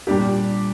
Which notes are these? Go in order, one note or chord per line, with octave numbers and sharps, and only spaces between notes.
A#2 G3 D4 G4